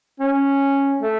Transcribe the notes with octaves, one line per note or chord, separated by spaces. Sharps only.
C#4
A3